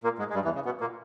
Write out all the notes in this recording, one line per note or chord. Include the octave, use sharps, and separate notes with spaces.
A#2 A#3
G#2 G#3
G#3
G2 G3
E2 E3
C#3
B2 B3
A#2 A#3